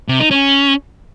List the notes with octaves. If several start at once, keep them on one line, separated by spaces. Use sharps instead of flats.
C3
D#4
C#4